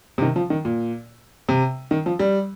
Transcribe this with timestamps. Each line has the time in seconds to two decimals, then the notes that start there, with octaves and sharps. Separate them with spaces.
0.18 C3
0.22 D#3
0.36 F3
0.50 D#3
0.65 A#2
1.49 C3
1.91 D#3
2.06 F3
2.19 G3